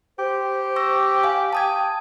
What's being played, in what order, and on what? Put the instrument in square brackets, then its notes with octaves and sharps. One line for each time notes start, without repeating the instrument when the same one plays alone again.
[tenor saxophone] G4 [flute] C5
[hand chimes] C#6 E6 A#6
F5 G#5
[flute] G5 [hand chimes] A5 D#6 G#6